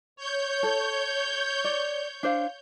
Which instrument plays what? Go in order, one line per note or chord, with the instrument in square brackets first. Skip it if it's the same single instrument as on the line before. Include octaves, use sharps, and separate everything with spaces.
[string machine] C#5 G6
[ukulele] A4
D5
D4 C5 F5